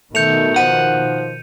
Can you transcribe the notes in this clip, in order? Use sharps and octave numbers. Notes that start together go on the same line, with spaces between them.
B2 D#3 A3 G6 C#7 F7
F3 F#5 D#7